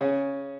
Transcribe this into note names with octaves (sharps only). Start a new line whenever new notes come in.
C#3 C#4